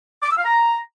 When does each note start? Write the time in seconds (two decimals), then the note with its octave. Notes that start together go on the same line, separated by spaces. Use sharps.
0.22 D6
0.30 E6
0.37 F5
0.45 A#5